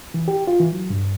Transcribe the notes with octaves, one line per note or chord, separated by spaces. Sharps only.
E3
G4
F4
E3
F#3
G2